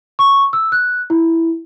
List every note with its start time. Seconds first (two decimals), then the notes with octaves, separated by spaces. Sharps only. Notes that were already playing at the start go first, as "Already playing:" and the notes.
0.19 C#6
0.53 E6
0.72 F#6
1.10 E4